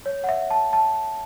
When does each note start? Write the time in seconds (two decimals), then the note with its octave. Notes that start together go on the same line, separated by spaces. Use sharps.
0.06 C#5
0.24 F#5
0.29 E5
0.50 A5
0.73 A5